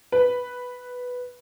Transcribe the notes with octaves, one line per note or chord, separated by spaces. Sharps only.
B4